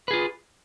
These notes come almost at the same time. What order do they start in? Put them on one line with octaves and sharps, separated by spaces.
B4 G#4 F4